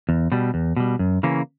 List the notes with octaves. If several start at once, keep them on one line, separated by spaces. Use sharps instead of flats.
E2
B2 G3
E2
B2 G3
F#2
C#3 E3 A#3 C#4